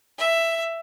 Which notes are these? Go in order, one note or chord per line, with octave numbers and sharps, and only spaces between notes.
E5